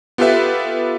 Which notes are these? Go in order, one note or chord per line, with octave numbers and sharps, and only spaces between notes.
B3 F4 G4 A4 B4 E5